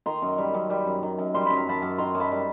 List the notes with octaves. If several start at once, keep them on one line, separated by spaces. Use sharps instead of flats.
D#3 A#5 C6
F#2
G3
F#2
G3
F#2
D#3
F#2
G3 C6
F#2 B5
A#5
F#2 A5 B5
F#2
D#3 A#5 C6
F#2
A5 B5
G3